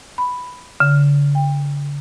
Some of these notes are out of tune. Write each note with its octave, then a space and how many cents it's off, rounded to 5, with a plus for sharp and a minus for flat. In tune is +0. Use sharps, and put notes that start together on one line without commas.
B5 +5
D3 -45
G5 +25